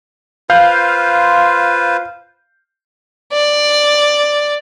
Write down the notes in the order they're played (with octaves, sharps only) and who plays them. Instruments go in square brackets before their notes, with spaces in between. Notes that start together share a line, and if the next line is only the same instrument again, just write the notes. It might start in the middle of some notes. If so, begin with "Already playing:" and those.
[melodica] F4 B4 C5 [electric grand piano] F5 G6
[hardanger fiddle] D5